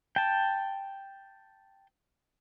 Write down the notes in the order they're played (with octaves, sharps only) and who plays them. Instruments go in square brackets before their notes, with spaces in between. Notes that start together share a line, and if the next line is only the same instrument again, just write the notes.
[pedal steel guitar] G5 A5